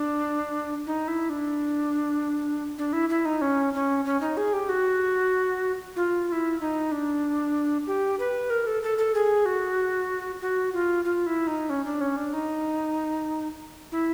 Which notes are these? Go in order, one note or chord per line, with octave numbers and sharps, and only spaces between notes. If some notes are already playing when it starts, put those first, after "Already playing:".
Already playing: D4
D#4
E4
D4
D4
E4
E4
D#4
C#4
C#4
C#4
D#4
G#4
G4
F#4
F4
F4
E4
D#4
D4
G4
B4
A#4
A4
A4
A4
G#4
F#4
F#4
F4
F4
E4
D#4
C#4
D4
C#4
D4
D#4
E4